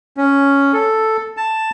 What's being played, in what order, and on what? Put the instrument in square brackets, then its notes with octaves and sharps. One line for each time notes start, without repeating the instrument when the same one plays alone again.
[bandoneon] C#4
A4
A5